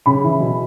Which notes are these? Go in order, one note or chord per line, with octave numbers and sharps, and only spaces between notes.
C#3 B5
E3
B2